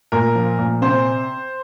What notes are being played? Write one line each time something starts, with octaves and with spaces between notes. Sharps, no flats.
A#2 A#4
F3
A#2
C3 C5